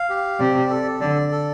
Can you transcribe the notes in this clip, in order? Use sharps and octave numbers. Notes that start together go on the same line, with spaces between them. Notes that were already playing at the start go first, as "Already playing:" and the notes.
Already playing: F5
G4
C3 D5
A4
D3 D5
A4